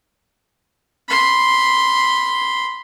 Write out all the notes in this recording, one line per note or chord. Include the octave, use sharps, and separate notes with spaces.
B5 C6